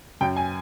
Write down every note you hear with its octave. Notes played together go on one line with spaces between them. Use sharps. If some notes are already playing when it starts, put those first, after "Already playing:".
F#2 G5
G#5